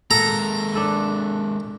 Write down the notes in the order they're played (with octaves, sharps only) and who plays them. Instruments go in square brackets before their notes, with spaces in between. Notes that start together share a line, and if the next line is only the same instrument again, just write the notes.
[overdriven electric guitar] G#3 A#3 [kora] A4 F#5 [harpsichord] A#5
[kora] D4 A4 B4